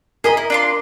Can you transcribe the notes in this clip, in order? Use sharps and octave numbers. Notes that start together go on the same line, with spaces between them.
G#4 A#4 D#5 A#5 B5
E4
D4 F4 C6